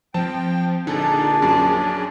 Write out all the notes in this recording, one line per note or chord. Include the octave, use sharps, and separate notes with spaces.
F3 C4 G5 A5
A#1 D3 D4 D#4 G#4 D5 A5
F#2 C#4